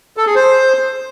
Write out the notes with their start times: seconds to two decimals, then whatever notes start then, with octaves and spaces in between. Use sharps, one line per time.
0.17 A4
0.26 G#4
0.35 C5